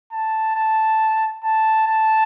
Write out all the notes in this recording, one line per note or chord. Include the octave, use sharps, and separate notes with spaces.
A5
A5
A5
A5